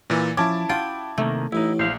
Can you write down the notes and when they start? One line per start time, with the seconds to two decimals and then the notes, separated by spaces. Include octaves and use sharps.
0.10 A#2 E3
0.37 F3 C#4 E4 A5 D6
0.69 F4 F#4 G5 D#6
1.18 C3 D#3 A3 A#3
1.52 A1 A2 D#4 E4
1.79 A#1 C5 F5